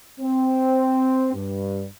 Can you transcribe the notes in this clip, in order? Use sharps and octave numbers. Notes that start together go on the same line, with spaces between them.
C4
G2